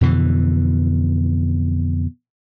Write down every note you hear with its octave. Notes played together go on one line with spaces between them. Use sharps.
F2 B2 D3 E3